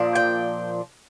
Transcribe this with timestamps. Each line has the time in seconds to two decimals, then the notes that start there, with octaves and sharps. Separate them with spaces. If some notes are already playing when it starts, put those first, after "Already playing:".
Already playing: A#2 F3 D4
0.15 G5